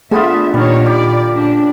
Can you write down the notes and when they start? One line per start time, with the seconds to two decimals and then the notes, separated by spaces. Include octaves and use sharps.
0.11 D3 A3 B3 F4 G#4 E5
0.54 A#2 D#3 G3 C#5
0.86 G4 D5 A#5
1.32 C#3 D4